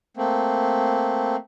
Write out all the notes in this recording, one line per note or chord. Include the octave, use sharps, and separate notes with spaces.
A3 A#3 C4